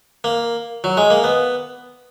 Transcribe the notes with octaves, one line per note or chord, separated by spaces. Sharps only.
A#3
F#3
G#3
A#3
B3